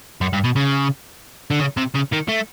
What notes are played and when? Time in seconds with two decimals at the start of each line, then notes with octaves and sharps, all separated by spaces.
0.21 F#2
0.33 G2
0.44 B2
0.56 C#3
1.51 D3
1.60 C#3
1.77 C3
1.94 C#3
2.12 D#3
2.28 A3